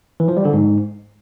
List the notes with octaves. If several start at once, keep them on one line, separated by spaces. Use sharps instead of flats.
E3
F3
G3
D3
G#2